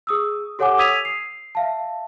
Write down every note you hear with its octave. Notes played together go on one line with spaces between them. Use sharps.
G#4 D#6 E6
G4 A4 C#5 F#5 G#5 D6
D#6 E6 G#6 B6 D#7 F7
C7
E5 F5 A5